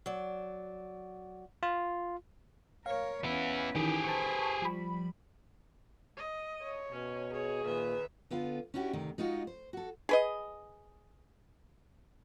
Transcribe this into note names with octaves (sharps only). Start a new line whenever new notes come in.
F#3 D5
F4
A#4 C#5 F5
B3 C#4 E4 B4
D#3 E3 G4 G#4
B4 C5 A5 C#6
F3 G3 B5
D#5
C#5
B2 C#4
G#4 C#5
A#2 D#3 B4 E5
D3 B3 F4 F5
C#4 D4 E4 F#4 G4
D2 C3 D#3
G#3 D#4 F4 F#4
C5
F#4 A4
G#4 B4 D#5